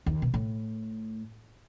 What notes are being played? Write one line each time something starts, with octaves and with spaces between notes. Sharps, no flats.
D#2
B2
A2